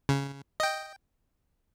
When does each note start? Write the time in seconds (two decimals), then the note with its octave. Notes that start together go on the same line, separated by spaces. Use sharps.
0.09 C#3
0.60 D#5 G5